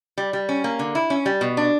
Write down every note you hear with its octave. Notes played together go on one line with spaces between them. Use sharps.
G3
G3
C#4
A#3
D3
E4
C#4
G3
B2
D4